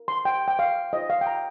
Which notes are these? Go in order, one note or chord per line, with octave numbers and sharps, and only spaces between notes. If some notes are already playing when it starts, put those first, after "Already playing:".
Already playing: A#4
C6
G5
G5
F5
F4 C5 D#5
F5
G5
A#5